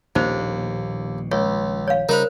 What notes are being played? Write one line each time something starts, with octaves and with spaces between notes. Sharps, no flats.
D#1 A#1 D#2 B2 D#4 C5
C#2 C#5
C#5 F5
C#3 G3 D#4 A#4 C5 B5